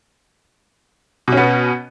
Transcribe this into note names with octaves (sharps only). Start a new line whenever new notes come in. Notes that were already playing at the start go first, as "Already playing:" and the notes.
B2 B3 C#4